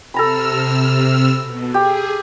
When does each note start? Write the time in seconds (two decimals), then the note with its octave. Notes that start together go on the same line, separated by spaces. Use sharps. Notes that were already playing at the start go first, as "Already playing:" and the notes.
0.14 C3 A4 A#5 B5 E6 F6
1.41 B2
1.74 G4 G#4